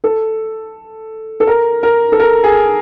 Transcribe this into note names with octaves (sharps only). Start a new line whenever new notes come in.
A4
A4
A#4
A#4
A4
A#4
G#4